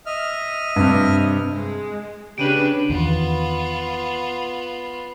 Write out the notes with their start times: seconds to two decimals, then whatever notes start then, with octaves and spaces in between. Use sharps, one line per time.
0.06 D#5 E5 F6
0.76 G2 C3
1.53 G#3
2.38 C#3 D4 G4 B4 D7 D#7 F#7
2.90 E2 D#3 B3 F4